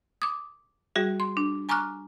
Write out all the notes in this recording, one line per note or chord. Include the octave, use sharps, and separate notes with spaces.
D6 D#6
G3 F#4 G#4 E5
C6
D4
G#5 A#5 C#6 D6 F6 F#6